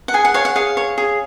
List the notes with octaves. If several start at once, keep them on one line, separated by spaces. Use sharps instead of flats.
F#5
G#4 G#5
F#5
C#5 F5
F#5
G#4 F5
C#5
G#4